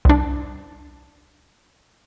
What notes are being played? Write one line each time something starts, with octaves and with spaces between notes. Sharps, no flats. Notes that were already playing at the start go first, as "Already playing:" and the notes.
C2 D4